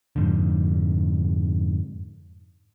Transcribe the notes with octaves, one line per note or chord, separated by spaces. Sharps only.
F2 G#2 D3